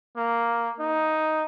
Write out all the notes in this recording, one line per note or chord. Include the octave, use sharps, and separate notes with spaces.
A#3
D#4